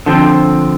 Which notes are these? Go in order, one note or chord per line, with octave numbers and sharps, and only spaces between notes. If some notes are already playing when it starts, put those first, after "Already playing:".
D3 F3 C4